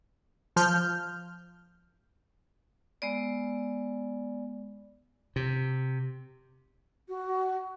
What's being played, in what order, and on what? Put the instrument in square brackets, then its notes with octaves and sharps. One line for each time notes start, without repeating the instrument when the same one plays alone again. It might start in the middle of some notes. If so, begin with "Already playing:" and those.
[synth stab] F3 F6 G6
[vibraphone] G#3 B3 D5
[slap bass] C3
[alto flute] F#4